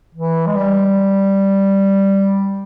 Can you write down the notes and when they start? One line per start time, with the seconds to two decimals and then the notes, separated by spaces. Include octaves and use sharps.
0.15 E3
0.47 G#3
0.55 G3